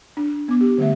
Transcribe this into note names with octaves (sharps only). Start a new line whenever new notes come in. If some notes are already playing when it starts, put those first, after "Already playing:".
D4
B3 D6
G4
D3 G3 A3 E5